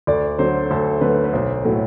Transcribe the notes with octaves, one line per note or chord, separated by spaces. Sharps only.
D2 D5
D3 F#3 A3 C5
D2 A4
D3 F#3 A3 B4
B4
B1 C5
A2 F#3 A3